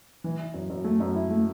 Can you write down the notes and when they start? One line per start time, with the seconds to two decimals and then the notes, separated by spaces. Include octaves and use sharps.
0.24 E3
0.39 E4
0.54 F#2
0.70 F#2
0.84 A3
1.00 F#2
1.15 E4
1.30 A3